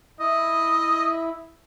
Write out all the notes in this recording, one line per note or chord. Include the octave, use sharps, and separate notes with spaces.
E4 D#5